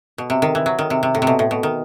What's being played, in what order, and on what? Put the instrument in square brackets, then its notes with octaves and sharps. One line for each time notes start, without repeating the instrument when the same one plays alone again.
[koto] B2
C3
D#3
E3
F#3
D#3
C3
C3
A2
C3
B2
A2
B2
D#3